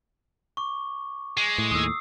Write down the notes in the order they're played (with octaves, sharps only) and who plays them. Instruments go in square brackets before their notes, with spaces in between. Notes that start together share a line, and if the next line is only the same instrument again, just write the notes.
[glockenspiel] C#6 D6
[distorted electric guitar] G#3 [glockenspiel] C7
[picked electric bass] A2
[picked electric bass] D#2 A2 [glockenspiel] D#6 E6